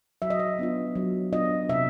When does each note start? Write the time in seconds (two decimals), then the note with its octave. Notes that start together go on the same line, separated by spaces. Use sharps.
0.22 F#3 E5
0.30 D#5
0.39 E5
0.59 B3 D4 F4
0.95 F#3
1.33 B3 D4 F4 D#5
1.69 C3 E5